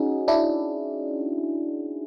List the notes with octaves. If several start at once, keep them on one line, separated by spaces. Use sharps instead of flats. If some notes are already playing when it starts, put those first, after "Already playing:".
Already playing: C#4 D#4 F#4 G#4
D4 E4